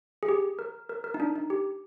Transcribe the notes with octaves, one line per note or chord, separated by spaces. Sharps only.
G#4
G4
A#4
A#4
A#4
D#4
D4
D#4
G4